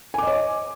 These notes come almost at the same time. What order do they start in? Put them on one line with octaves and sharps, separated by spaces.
G#5 D6 D#5 C#5